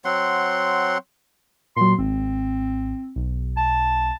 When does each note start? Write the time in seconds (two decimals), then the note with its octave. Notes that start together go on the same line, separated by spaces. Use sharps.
0.05 F#3 C4 F#5 C6
1.76 A#2 F#3 C6
1.98 G#1 C4
3.16 B1
3.57 A5